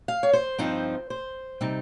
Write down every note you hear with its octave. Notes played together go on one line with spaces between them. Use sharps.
F5
C#5
C5
G2 F3 C4 D#4
C5
C3 G3 C4 D#4